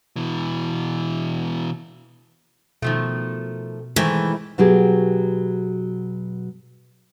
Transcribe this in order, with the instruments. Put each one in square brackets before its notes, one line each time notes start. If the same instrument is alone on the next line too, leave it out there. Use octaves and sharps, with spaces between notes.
[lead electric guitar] B2 E3
[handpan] B2 [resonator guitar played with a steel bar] D#3 F3 A3
[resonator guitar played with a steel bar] D#3 A3 D#4 [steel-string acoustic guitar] E3 [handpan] G#3 E4 C5
[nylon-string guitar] B2 F#3 G4 G#4